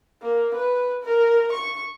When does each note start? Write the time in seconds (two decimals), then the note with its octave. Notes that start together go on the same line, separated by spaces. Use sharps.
0.22 A#3
0.55 B4
1.03 A#4
1.53 C#6